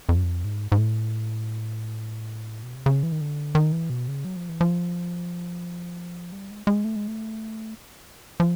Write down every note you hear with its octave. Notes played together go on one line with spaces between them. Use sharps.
F2
F#2
F2
G#2
G#2
A2
B2
C3
C#3
E3
D#3
D3
D#3
E3
B2
C#3
F#3
F3
E3
F3
G3
G#3
G#3
A3
G#3
A3
F3